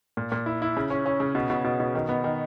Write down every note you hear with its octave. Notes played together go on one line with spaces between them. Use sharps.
A#2
A#2
E4
E4
C#3
C#4
C#4
C#3
B2
B2
B2
B2
D#3
B3
D#3